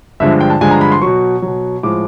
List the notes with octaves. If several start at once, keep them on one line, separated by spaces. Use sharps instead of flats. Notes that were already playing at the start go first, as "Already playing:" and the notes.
G2 D3 F3 G#3 E5
G5
A5
G2 D3 F3 G#3 G#5
A#5
B5
C6
B2 F#3 C#6
B2 F#3
A2 F3 G#3 D6